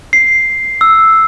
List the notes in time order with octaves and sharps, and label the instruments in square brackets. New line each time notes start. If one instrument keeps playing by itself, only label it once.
[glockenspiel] C7
E6